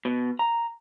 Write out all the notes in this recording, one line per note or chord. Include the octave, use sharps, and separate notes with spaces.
B2
A#5